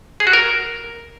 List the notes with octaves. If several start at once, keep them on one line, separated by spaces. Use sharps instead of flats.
G#4
F#4
A#4